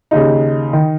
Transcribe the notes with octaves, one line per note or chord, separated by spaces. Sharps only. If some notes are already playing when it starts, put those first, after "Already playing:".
D#2 C#3 D#4
D#3